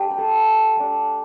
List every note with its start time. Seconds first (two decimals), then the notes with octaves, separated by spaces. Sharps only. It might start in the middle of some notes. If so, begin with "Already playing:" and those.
Already playing: A3 D4 G4 G5
0.11 B5
0.18 A4 A5
0.77 A3 D4